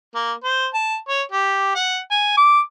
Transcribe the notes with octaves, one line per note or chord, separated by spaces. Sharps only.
A#3
C5
A5
C#5
G4
F#5
G#5
D6